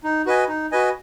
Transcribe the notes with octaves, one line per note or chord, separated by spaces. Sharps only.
D#4
F#4 B4 D#5 G#5
D#4
F#4 B4 D#5 G#5